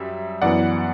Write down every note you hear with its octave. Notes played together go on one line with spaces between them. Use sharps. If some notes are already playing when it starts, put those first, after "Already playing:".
Already playing: F#2 G3 E5
F#2 E3 B3 D5 F#5